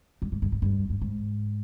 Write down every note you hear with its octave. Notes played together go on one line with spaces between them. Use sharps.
G2
G#2
G2
G#2
G2
G2
G#2